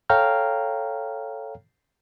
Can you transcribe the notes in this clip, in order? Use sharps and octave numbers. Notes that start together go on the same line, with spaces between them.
A4 C#5 F5 G5 A#5 F6